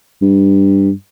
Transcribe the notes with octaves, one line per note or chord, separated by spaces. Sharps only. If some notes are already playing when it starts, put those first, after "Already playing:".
G2